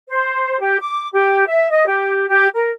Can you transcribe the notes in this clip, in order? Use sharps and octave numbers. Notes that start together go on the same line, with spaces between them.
C5
G4
D6
G4
E5
D#5
G4
G4
A#4